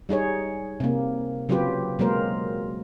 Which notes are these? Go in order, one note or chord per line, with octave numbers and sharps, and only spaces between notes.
G3 D#4 G#4 C#5
C3 A#3
C#3 F#3 C4 F4 G4 B4
B2 F#3 G#3 A#3 A#4 C5